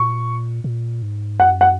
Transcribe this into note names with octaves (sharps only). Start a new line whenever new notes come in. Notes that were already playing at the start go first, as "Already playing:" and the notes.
Already playing: A#2 C#6
A#2
G#2
F#2 F#5
F#5